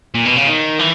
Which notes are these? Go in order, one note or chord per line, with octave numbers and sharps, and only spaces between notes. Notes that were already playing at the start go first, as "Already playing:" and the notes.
A#2
B2
C#3
D#3
E3